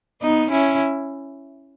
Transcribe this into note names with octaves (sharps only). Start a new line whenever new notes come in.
B3 D#4
C#4 E4